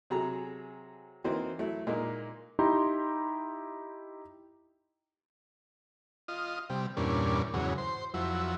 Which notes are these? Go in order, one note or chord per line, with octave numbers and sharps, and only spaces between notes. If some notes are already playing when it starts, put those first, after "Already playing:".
C3 F#3 G#4 A4 A#5
E3 A#3 C4 D#4 F#4 C5
F#3 A3 E4
A#2 G#3 A#3 D#4
D#4 E4 G4 A#5 C6
F4 D#5
C3 G3
E2 G2 A#2 C#4 D4
E2 G#2 C#3 F#3
C5
F2 F#3 E4